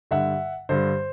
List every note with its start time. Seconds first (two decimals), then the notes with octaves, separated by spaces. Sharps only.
0.11 G2 D3 E5 F#5
0.69 G2 D3 C5